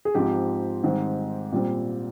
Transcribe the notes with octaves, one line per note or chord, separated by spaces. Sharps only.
G#4
G#2 F3 C4 G4
G#2 D#3 G3 C4
A#2 G3 C4